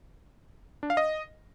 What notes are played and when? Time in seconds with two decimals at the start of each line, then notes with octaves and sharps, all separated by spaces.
0.83 D4
0.90 F5
0.97 D#5